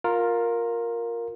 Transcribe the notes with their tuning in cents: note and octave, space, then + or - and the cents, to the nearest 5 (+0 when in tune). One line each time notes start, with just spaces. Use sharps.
F4 +15 A#4 +0